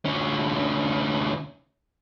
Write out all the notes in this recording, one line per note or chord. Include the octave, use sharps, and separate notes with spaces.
D2 C#4